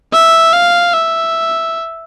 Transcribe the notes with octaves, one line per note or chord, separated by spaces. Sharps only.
E5
F5
E5